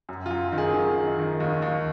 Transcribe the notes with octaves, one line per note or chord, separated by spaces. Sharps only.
F#2
F4
F#2
D#3
G#4
D#3
D#3
D#3
D#2
D#2